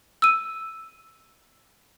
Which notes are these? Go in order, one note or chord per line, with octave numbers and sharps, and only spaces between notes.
E6 D#7